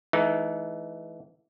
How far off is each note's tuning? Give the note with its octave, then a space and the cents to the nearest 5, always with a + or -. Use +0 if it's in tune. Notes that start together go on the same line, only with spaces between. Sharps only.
E3 +0 A3 -40 D#4 +0